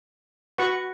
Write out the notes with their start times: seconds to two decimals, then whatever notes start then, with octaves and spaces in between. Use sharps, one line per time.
0.58 F#4 B4 F#5 C#6